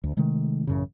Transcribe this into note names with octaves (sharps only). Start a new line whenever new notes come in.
D2
C3 D#3 G#3 A3
A1 F#2 C#3